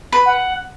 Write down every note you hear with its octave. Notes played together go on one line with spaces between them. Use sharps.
B4
F#5